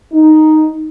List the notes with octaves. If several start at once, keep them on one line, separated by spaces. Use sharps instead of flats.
D#4